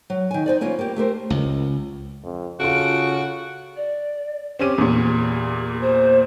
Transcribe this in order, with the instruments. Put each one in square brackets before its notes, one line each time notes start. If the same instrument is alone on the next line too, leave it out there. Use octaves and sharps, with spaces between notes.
[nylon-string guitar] F#3
D#3 G#5
D#4 C5 D5
A#3 B3 C#4 F4
A#3 G4
A3 G4 A#4 C5
[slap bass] C#2
[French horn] F2
[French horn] C#3 [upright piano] F4 A4 [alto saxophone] F#4 [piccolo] D7
[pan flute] D5
[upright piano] C4 C#4 D#7 [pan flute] G4
[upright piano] E2 A#2
[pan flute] G4
C5